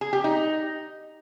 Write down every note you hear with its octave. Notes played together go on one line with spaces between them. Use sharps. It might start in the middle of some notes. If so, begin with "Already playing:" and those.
G#4
G4
D#4